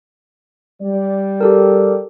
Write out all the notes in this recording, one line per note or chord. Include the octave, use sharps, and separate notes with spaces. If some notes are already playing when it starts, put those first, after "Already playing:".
G3 D5
G4 A4 A#4